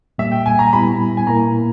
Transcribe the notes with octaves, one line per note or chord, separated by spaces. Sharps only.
A#2 G3 A#3 E5
G5
G#5
A#5
A#2 G3 B3 E4 B5
G#5
A#2 A#3 E4 A#4 A#5